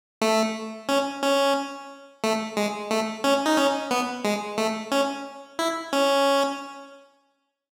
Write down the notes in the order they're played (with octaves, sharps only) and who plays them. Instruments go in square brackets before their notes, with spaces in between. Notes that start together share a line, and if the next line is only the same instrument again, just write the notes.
[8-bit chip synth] A3
C#4
C#4
A3
G#3
A3
C#4
D#4
C#4
B3
G#3
A3
C#4
E4
C#4